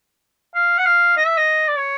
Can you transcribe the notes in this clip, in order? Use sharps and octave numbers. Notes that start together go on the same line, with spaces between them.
F5
F#5
F5
D#5
E5
D#5
D5
C#5